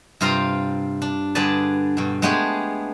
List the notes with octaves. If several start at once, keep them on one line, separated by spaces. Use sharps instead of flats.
G2 C3 F4 F5 G5 A#5
D4
G2 D3 G#4 B4 D5 A5
G2 B2
G#3 A3 B3 D4 G4 G#4